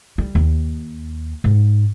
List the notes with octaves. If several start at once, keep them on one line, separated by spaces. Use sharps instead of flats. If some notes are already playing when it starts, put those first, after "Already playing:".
G3
D#2
G#2